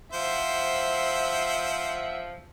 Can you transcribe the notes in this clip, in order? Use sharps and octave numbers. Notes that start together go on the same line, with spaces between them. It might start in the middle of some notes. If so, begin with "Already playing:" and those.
F3 C5 E5 F#5